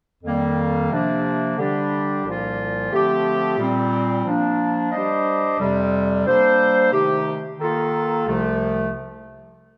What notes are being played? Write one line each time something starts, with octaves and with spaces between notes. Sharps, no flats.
F2 D#3 G3 A#3
C3 F3 A#3 D4
D3 G3 D4 G4
C2 A#2 F3 A#3 F4
D3 F3 A3 C4 G4
A#2 G3 C4
F3 A#3 D4
G3 D4 G4 C5 D#5
F2 C3 G3
G3 A#3 D4 A4 C5
C3 D#3 A3 D#4 G4
D#3 A#3 F4 A4
C2 C3 F3 A3